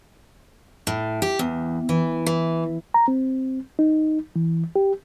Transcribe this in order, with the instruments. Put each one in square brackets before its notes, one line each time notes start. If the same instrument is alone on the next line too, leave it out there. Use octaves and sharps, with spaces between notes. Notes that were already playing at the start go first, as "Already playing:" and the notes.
[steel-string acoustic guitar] A2
G4
E2
E3
E3
[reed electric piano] A#5
C4
D#4
E3
G4